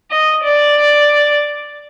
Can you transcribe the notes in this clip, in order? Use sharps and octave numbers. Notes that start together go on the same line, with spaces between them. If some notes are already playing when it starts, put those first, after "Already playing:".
D#5
D5